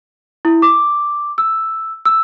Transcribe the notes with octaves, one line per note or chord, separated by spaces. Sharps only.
E4
D6
E6
E6